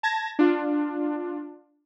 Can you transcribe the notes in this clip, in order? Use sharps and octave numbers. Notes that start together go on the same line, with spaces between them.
A5 G#6 A#6
D4 F4